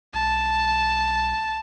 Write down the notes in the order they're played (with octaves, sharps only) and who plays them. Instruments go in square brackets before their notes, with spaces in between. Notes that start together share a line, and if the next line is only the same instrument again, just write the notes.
[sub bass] B1 [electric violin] A5